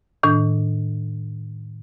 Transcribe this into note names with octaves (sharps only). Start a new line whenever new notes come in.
A2 D#3 D4